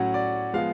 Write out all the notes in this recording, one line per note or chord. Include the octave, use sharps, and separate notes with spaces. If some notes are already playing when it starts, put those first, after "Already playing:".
Already playing: A2 F#3 C#4 F#4 F#5
D5
F3 G#3 B3 F5